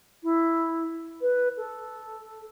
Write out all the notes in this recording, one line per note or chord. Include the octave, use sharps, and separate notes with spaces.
E4
B4
A4